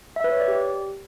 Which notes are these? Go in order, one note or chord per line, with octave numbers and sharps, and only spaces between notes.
E5
B4
C#5
D5
G4